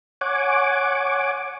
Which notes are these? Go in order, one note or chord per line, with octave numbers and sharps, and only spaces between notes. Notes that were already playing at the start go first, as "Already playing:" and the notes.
C#5 F#5 G#5 D6